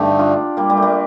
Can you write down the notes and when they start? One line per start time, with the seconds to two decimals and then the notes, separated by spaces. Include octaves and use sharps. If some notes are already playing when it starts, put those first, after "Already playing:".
Already playing: G2 D3 A3 D#4 G4
0.19 D4 F4
0.57 G3 A#3
0.70 G3 A#3
0.77 A3
0.82 G3 A#3